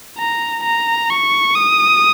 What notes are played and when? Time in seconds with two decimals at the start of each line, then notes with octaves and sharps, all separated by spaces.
0.18 A#5
0.63 A#5
1.10 C#6
1.55 D#6